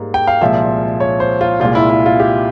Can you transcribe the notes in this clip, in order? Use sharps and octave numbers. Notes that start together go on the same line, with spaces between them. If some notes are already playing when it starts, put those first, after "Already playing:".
Already playing: G#2 G3 A#3
G5
F5
C2 A#2 F3 G#3 E5
C#5
C5
F4
C2 A#2 G#3 F4
E4
E4
F4
G4